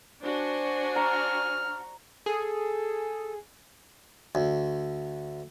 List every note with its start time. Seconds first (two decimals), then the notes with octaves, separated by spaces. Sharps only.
0.22 D4 F#4 C5 G#5
0.96 A#5 F6
2.26 G#4 A4
4.35 D2